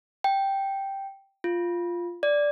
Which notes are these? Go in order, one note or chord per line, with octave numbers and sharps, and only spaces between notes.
G5
F4
D5